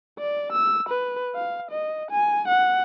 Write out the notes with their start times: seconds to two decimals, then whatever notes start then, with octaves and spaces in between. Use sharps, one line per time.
0.19 D5
0.52 E6
0.89 B4
1.35 F5
1.71 D#5
2.11 G#5
2.48 F#5